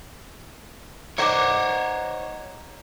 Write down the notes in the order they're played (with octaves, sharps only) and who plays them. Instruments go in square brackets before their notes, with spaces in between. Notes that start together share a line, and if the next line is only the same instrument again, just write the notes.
[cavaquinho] D#4 F#5 D6 [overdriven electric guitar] C5 C#5